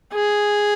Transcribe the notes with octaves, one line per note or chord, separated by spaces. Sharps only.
G#4